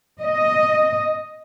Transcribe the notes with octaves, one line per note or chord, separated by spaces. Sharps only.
D#5